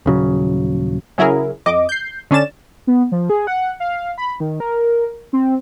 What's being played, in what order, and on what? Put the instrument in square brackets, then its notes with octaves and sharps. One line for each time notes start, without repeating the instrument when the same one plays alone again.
[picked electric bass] D#1 C#3 F#3
[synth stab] C#3 F#3 E4 G#4 A#4
F2 D#5 D6
G6 C7
D3 C#4 D4 A6 E7
[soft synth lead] B3
F3
G#4
F#5
F5
B5
D#3
A#4
C4